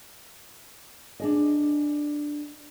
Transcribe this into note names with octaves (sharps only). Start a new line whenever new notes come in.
D4 G#4 D#5